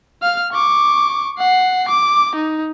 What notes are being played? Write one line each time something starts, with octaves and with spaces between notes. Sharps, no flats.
F5 F6
C#6 D6
F#5 C7
D6
D#4